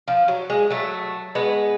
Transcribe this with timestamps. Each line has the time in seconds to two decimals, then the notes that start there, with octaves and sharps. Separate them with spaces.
0.08 F3
0.28 F#3
0.50 G#3
0.70 F#3 A3
1.35 G#3 B3